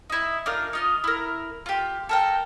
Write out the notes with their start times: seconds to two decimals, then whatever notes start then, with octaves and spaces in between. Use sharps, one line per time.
0.10 D#4 E4
0.46 D4 D#4 F4 A#4
0.73 D#4 F4 D#5
1.04 E4 A#4
1.66 F4 G4
2.09 A4 A#4 G5